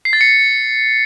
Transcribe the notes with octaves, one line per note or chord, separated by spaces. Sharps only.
C7
A6
C#7